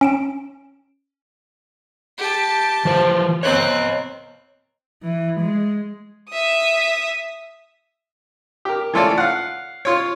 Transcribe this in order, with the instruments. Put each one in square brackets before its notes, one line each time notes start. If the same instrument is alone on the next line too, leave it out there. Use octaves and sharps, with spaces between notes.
[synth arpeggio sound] C#4 D7 E7
[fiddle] G4 A5
[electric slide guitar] E3 F3 C5
[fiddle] C4 F#6 [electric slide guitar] C#5 D#5 A#5
[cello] E3
G#3
[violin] E5 D#6
[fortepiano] G4 A#4
E3 A3 F4 A4 C#5 D5
F5 F#5
F4 C#5